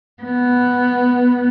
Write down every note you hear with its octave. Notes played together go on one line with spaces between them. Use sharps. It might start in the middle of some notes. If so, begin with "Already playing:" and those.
B3